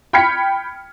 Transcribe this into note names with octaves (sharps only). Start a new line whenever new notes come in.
G5 B5 F6 G#6 B6 C#7